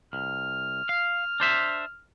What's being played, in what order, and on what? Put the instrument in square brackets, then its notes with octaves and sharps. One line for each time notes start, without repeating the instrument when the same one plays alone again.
[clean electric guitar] C2 [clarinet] F6
[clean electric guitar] F5
D4 C5 E5